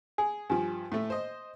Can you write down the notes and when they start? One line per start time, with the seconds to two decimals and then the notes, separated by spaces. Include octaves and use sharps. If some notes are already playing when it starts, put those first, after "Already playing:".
0.18 G#4 G#5
0.50 G2 F3 G#5
0.92 A2 A3
1.10 C5 D#5